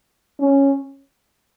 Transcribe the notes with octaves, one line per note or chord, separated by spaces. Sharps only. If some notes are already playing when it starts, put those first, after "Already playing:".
C#4